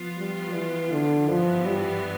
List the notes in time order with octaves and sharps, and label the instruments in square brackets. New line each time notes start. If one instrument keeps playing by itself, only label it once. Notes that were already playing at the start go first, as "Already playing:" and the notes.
Already playing: [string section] F3 B3 F4
[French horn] G3
E3
D3
[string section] G2 E3 B3 [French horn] F3
[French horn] G3